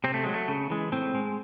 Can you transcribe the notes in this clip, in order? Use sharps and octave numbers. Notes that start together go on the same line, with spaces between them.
C3 C4
A3
F#3 G#3
A3
C#3
E3 G#3
A2 C4
G#3